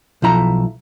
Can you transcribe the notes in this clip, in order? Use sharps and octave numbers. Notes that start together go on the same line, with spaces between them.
B1 F3 E4 A#5